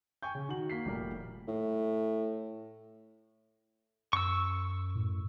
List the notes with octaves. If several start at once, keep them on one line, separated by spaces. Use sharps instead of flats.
G5 G#5 C#6 G6
C#3
D#3 F#4 F#7
A#3 B6 C7
F1 A#2 G3 A#4
A2
F#2 C#6 E6
A2